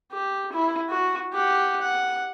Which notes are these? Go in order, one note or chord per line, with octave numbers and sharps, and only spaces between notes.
G4
E4
F#4
G4 F#5
F#5